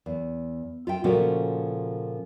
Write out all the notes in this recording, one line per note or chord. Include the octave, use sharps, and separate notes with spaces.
E2
F4 E5 G5
A#2 C#3 F3 A3 C#4 F#4